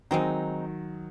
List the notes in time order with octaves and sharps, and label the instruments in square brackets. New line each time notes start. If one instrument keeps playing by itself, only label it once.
[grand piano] D#3 F#3 [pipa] G#3 C4 D#4